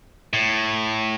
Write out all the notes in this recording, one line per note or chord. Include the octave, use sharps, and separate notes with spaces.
A2